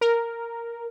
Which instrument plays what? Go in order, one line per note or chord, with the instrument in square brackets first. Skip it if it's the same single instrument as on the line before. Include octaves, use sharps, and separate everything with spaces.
[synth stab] A#4